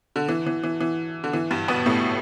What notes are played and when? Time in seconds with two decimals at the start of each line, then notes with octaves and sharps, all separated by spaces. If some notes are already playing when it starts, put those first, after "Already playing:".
0.16 D3
0.29 E3
0.46 E3
0.63 E3
0.80 E3
1.24 D3
1.33 E3
1.51 G2 G3
1.68 B2 B3
1.86 A2 A3